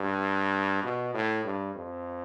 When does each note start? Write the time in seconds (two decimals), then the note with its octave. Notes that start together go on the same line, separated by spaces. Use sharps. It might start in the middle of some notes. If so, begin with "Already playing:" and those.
Already playing: G2
0.83 B2
1.14 A2
1.44 G2
1.75 F2